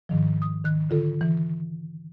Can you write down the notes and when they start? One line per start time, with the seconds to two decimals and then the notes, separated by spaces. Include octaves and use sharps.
0.09 G#2 D#3 F3
0.42 D#6
0.64 D#3 F#6
0.90 D3 F4 A4
1.21 E3